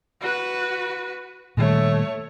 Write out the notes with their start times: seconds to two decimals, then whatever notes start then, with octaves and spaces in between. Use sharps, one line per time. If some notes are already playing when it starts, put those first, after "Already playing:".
0.21 F#4 B4
1.57 A#2 D#3 G3 A3 C#5